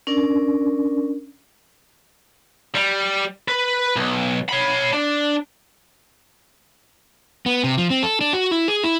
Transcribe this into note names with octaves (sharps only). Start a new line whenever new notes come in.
C#4 D4 A#4 D5
G3
B4
B1
C#5 B5
D4
B3
C3
F3
C4
A4
D4
F#4
E4
G#4
E4